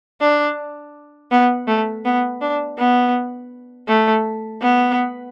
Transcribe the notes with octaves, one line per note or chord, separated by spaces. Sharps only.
D4
B3
A3
B3
D4
B3
A3
B3